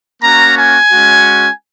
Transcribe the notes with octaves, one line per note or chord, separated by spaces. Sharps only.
A#3 C#4 F#4 A#5
G#5
G#3 C#4 F#4